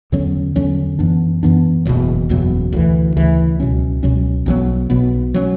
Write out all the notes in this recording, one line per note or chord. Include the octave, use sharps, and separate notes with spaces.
E2 D3 F#3 C#4
E2 D3 F#3 C#4
F#2 E3 B3 D4
F#2 E3 B3 D4
F#1 E2 B2 F#3
F#1 E2 B2 F#3
D2 C#3 E3
D2 C#3 E3
C#2 B2 F#3 C#4
C#2 B2 F#3 C#4
B1 B2 F#3 B3
B1 B2 F#3 B3
F#3 A#3 C#4